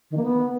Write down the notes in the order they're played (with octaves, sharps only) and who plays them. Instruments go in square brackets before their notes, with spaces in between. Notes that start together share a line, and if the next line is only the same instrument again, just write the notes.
[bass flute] D#3
A#3
B3